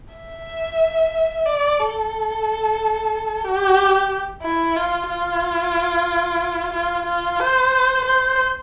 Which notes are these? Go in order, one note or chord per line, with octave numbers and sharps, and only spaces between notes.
E5
D5
A4
G4
E4
F4
F4
F4
F4
C5
C5